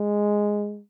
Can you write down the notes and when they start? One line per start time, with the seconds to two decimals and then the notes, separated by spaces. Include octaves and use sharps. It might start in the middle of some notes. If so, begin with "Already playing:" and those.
Already playing: G#3